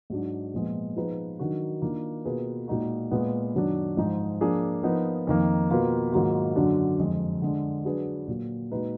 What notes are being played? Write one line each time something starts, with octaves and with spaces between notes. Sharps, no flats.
G#2 F#3 D4
A#2 F3 G#3 B3
F3 B3 D#4 G#4 B4
D#3 F#3 D4 F#4 A#4
D#3 A#3 D4 F4
B2 A#3 F4 G#4 B4
A#2 G#3 D#4 F#4
A#2 G#3 B3 F4 B4
F#2 D#3 F#3 D4
G#2 F3 G#3 D#4
F3 A#3 D4 G#4
F3 B3 D#4 A#4
F2 D#3 A#3
B2 A#3 F4 B4
G#2 D#3 F#3 A#3 F4
F#2 D3 F#3 D4
F2 D3 G#3
D3 G#3 D4
F#3 D4 G#4 B4
A#2 F#3 A#3
A#2 G#3 D#4 F#4 B4